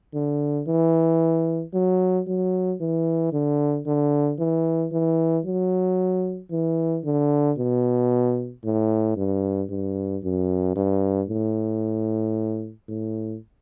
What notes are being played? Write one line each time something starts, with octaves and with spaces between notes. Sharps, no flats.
D3
E3
F#3
F#3
E3
D3
D3
E3
E3
F#3
E3
D3
B2
A2
G2
G2
F#2
G2
A2
A2